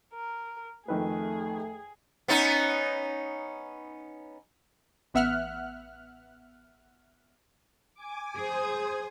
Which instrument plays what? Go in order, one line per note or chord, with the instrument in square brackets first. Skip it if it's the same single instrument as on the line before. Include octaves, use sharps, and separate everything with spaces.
[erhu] A#4
[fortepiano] F2 D#3 B4 [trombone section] A3 [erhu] G#4
[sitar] B3 C#4 D#4
[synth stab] A1 B3 E5 F#5 F6 F#6
[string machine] G#5 D6
[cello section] G#4 [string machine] C5 D#6 G#6